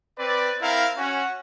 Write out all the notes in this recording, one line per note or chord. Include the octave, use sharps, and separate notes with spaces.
C4 B4 D5
C4 E4 A#4 F5
C#4 F#4